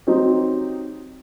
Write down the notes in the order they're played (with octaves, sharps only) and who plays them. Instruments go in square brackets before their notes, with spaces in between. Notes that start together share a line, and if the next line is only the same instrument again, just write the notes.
[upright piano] F#3 C4 D#4 G4